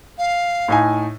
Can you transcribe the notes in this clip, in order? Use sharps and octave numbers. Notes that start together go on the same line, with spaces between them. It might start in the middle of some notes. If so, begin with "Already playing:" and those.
F5
A2 D#4 G#5